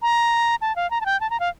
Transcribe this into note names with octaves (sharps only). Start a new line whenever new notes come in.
A#5
A5
F5
A#5
A5
G5
A5
A#5
F5